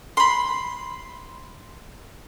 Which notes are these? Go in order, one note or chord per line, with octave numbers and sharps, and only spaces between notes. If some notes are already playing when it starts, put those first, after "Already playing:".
B5 C6